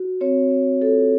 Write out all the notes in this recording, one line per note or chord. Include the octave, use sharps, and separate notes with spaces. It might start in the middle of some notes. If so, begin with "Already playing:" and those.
Already playing: F#4
C4 C#5
C4
F4 A4